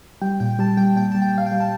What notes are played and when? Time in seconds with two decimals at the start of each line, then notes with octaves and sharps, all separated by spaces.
0.22 G3 G5
0.40 A#2 G5
0.59 G3 A5
0.77 G3 G5
0.96 A#2 G5
1.12 G3 A5
1.22 G5
1.33 G3 F5
1.46 G5
1.52 G3
1.60 A5